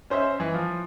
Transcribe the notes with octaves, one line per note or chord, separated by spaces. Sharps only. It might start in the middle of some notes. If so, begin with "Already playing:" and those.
C#4 C5 D#5 E5
E3
F3